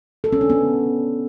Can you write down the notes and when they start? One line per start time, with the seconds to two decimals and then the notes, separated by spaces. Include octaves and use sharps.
0.24 A4
0.32 C#4
0.41 D4
0.50 B3